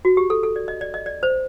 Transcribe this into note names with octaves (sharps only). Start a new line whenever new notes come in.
F#4
G4
A4
A4
D5
D#5
D5
D#5
D5
C5